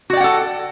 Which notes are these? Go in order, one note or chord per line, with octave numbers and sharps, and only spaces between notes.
F#4 A4 D5 F#5 G5